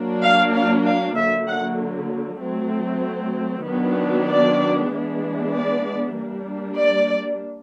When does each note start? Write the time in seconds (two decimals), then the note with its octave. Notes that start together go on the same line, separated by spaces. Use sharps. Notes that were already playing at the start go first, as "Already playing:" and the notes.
Already playing: F#3 A#3 D4
0.23 F5
0.54 F5
0.86 F5
1.17 D3 F#3 A#3 E5
1.48 F#5
2.40 F#3 A3 C4
3.65 D#3 F#3 B3 D4
4.28 D5
4.90 E3 G#3 B3 D4
5.51 D5
6.15 G3 A#3 D4
6.76 D5